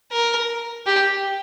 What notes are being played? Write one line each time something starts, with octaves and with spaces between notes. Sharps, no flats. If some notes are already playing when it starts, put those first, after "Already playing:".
A#4
G4